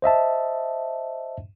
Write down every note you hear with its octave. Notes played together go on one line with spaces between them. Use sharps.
C5 D#5 E5 A5